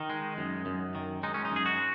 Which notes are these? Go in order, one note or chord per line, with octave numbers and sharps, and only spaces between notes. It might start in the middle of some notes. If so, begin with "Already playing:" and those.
Already playing: D#3 D#4
G#3
F#2
F#2
D#3
G#3 D#4
C#4
D#4
F#2 G#4
F#4